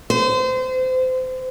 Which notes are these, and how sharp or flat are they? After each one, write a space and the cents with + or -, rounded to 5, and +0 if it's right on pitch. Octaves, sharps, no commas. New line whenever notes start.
C5 -30